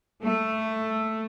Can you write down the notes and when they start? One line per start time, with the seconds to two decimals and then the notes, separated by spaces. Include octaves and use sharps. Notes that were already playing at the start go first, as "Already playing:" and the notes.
0.23 A3